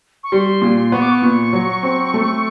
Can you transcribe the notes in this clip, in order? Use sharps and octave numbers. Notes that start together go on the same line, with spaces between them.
C#6
G3 C6
A#2
B3 C#6
D6
C#6
A#2
F#3
C4
A3